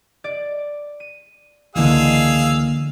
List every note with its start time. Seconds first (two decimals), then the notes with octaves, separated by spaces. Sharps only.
0.24 D5
1.00 D#7
1.76 C#2 D3 E3 G#3 A#3 G#4 F5 E6